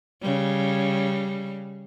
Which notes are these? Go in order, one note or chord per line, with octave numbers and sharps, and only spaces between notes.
C#3 G3